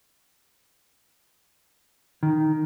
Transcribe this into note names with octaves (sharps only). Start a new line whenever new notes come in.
D#3